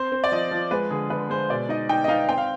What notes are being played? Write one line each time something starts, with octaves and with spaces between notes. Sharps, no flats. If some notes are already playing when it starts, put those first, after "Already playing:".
Already playing: C4 C5
C4
D5
F3 D#5
F3
G#3 B4
D3 G#4
D3 B4
G#3 C5
B2 D5
D#4 D#5
D#4 G5
D#5
D#4 F5
C4 G5
F5